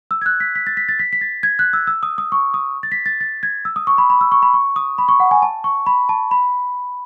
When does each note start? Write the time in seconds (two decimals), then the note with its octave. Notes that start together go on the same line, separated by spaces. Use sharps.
0.11 E6
0.21 G#6
0.26 F#6
0.40 B6
0.55 B6
0.67 A6
0.77 B6
0.89 A6
0.99 B6
1.13 B6
1.21 A6
1.43 G#6
1.59 F#6
1.73 E6
1.87 E6
2.03 D#6
2.18 D#6
2.32 C#6
2.54 D#6
2.83 A6
2.92 B6
3.06 A6
3.21 A6
3.43 G#6
3.65 E6
3.76 D#6
3.87 C#6
3.98 B5
4.10 B5
4.21 E6
4.32 C#6
4.43 B5
4.54 C#6
4.76 D#6
4.98 B5
5.09 C#6
5.20 F#5
5.31 G#5
5.42 A5
5.64 C#6
5.87 B5
6.09 A5
6.31 B5